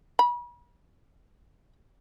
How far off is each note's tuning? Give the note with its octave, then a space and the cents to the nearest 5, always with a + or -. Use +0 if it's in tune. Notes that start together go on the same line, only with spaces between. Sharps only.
B5 -40